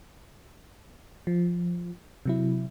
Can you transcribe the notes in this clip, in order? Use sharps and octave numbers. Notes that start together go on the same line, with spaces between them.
F3
C3 F#3 E4